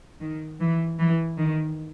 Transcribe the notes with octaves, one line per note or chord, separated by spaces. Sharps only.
D#3
E3
E3
D#3